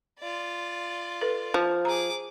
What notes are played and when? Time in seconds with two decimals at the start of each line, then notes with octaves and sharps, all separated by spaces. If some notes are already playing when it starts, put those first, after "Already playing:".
0.19 F4 D5
1.21 A4 B4
1.54 F3
1.85 G#4 A#5 D6